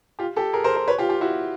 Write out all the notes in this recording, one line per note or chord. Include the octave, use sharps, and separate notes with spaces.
F4 G4
G4 A4
G#4 A#4
A#4 C5
A#4 C5
B4 C#5
F4 G4
F4 G4
E4 F#4